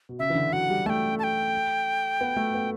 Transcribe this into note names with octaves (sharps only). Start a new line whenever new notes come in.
B2
C#3 E5
E3
D3
F#3 F#5
G3
A3 G5 A5
A5
G5
B3
A3
B3